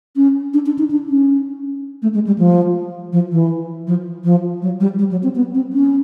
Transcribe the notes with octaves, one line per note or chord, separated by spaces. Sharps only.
C#4
D4
D4
D#4
D4
C#4
A3
G#3
G3
F3
F3
E3
F3
F3
F#3
G3
G3
F#3
C4
B3
C4
C#4